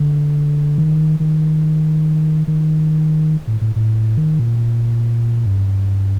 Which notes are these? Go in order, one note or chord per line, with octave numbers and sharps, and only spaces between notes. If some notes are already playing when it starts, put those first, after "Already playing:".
Already playing: D3
D#3
D#3
D#3
A2
A2
A2
D#3
A#2
G2